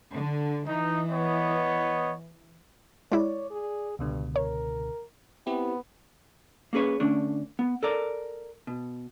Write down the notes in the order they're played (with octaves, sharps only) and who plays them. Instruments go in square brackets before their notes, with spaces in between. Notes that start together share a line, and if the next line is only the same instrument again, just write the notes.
[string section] D3
[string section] E3 [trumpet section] D#4
[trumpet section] B3 C#5 D#5
[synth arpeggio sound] G#3 E4 [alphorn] C#5 [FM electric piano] D5
[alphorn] G#4
[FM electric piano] C#2 B2 D3 [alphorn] G2
[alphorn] A#4 [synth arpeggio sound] C#5
[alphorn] B3 [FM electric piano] C4 E4 G4
[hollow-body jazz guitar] A#3 C#4 G#4 B4 C#5
D3 A3 C#4 D4
B3
A4 A#4 D5
B2